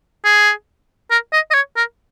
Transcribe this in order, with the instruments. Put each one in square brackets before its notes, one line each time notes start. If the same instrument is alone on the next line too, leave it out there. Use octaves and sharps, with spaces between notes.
[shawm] G#4
A#4
D#5
D#5
C#5
A#4